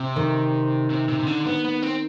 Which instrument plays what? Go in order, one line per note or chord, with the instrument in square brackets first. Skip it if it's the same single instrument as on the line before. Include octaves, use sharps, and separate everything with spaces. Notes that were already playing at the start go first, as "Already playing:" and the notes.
Already playing: [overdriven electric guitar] C3
[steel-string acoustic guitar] D#3
[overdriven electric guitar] C3
C3
C3
D3
B3
B3
C4